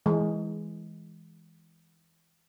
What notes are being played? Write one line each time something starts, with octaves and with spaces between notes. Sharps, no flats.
E3 G#3